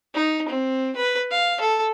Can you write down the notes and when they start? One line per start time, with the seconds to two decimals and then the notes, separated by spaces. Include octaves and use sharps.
0.14 D#4
0.48 C4
0.96 B4
1.31 F5
1.60 A4